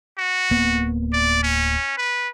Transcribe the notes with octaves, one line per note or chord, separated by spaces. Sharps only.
F#4
D1 A#3 B3
D5
C#4
B4